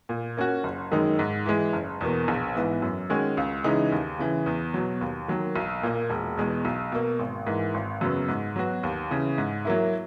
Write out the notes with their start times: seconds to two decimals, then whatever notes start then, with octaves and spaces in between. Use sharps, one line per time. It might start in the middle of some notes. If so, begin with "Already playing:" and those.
0.09 A#2
0.37 A#3 C#4 F#4
0.64 F#1
0.92 F#2 D#3 G#3 D#4
1.19 G#2
1.46 E3 G#3
1.73 F#1
2.01 E2 B2 A#3
2.28 A#1
2.55 G#2 E3 B3
2.82 F#2
3.10 D#3 G#3 C#4 F#4
3.37 C#2
3.64 C#3 E3 G#3 D#4
3.92 D#2
4.19 C#3 E3
4.46 E2
4.74 B2 F#3
5.01 D#2
5.28 D#3 F#3 A#3
5.56 B1
5.83 A#2 A#3
6.10 E1
6.37 E2 B2 G#3
6.65 B1
6.92 B2 A#3
7.19 G#1
7.47 G#2 E3 A#3
7.74 G#1
8.01 F#2 C#3 F#3 B3
8.28 G#2
8.56 F#3 B3 F#4
8.83 D#2
9.11 C#3 E3
9.38 G#2
9.65 F#3 A#3 E4